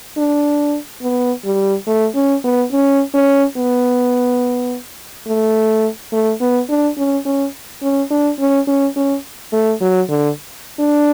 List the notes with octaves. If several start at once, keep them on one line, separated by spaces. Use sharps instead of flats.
D4
B3
G3
A3
C#4
B3
C#4
C#4
B3
A3
A3
B3
D4
C#4
C#4
C#4
D4
C#4
C#4
C#4
A3
F#3
D3
D4